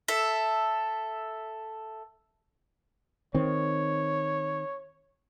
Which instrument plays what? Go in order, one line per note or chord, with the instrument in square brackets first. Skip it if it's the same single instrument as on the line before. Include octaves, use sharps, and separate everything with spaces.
[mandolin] A4 E5
[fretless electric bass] D#3 C4 [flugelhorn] C#5